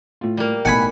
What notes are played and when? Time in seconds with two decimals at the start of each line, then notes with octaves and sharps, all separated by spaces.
0.21 A2 F4
0.37 G3 A#3
0.65 B1 A2 F#5 G#5 B5